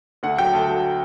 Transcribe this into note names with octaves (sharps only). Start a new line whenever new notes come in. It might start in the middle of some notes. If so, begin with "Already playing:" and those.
D2 F#5
F#3 G5
D2 A5
F#3